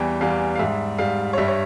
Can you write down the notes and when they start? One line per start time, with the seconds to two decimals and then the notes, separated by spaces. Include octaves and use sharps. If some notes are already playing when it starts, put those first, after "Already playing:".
Already playing: E2 E3 G3 G5
0.21 E2 E3 G3 F5
0.55 F5
0.59 G#2 G3 E5
0.98 G#2 G3 F5
1.33 C#5
1.38 G2 G3 E5
1.48 C#5